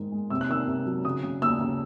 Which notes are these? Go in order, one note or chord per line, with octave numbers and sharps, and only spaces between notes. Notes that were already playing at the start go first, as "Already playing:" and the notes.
Already playing: G#2 D#3 G#3
G#3
C3 E6
F#6
D#3 E6
C3
F#3
C#3 D#6
C#3
D#2 E6
C#3